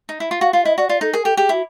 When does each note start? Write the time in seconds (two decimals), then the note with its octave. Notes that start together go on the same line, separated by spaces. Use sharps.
0.09 D#4
0.20 E4
0.31 F4
0.41 F#4 F5
0.53 F4 F5
0.65 E4 D#5
0.78 F#4 D5
0.89 F4 D5
1.01 D#4 A4
1.13 G#4 A#4
1.25 G4 A4
1.37 G4 G#4
1.49 E4 F#4